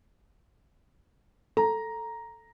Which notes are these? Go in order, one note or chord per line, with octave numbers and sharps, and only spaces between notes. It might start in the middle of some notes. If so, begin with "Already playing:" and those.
A4 A#5